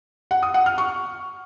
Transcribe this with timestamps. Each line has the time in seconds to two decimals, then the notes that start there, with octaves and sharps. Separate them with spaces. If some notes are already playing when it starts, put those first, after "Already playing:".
0.31 F#5
0.43 D#6
0.54 F#5
0.66 F6
0.78 C#6